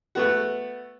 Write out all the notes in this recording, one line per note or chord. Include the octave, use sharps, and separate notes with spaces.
A3 B3 F#4